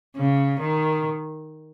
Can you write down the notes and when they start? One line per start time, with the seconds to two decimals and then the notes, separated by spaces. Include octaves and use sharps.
0.17 C#3
0.60 D#3